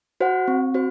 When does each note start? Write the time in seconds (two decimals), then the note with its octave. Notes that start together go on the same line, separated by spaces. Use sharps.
0.20 F#4 C5 F#5
0.48 C4
0.74 F#4 C5